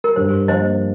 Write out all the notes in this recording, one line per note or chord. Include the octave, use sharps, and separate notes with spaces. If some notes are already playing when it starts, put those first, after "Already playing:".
A#4
G2 C5
F3 A#3 C5 D#5